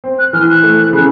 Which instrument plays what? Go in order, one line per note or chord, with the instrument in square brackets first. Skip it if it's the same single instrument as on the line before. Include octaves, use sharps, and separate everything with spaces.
[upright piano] C4
[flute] F#6
[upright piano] E3 [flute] F6
[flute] F#6
[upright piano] A3
C#3